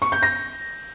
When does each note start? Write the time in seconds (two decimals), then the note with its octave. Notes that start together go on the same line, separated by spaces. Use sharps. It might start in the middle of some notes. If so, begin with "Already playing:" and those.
0.02 C#6
0.12 G6
0.23 A#6